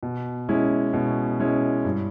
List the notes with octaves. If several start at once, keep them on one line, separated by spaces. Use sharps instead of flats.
B2
G#3 C#4 E4
B2
G#3 C#4 E4
G2